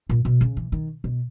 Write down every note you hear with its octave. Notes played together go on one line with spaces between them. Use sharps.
A#2
B2
C#3
E3
D#3
B2